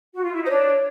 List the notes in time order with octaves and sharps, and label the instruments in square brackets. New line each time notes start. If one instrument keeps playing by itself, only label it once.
[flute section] F#4
F4
E4
D#4
[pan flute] C5
[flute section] D4 [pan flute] C#5